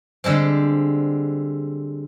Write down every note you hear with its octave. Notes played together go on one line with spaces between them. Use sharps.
D3 G3 G#3 C4